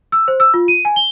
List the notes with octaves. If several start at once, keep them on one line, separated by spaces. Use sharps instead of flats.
E6
C5
E6
F4
D#7
G#5
G7